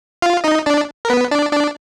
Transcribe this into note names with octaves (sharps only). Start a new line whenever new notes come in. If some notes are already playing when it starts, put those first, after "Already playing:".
F4 F5
D#4 D#5
D4 D5
A#4
B3 B4
D4 D5
D4 D5